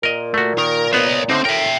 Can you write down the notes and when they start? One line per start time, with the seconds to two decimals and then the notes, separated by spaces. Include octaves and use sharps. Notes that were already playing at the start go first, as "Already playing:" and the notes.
0.03 A#2 A#4 D#5
0.34 A3 F#4
0.58 D#3 A#4
0.93 B3 C5 C#5 D#5
1.30 A2 D3 C4 D#4 C5
1.45 A2 A#4 E5 G5